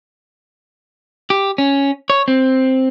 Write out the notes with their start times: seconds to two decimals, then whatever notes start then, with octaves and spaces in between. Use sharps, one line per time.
1.30 G4
1.58 C#4
2.10 C#5
2.28 C4